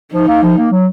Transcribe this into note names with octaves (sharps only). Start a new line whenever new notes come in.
F3 D#4
A#3
F3
A#3
F#3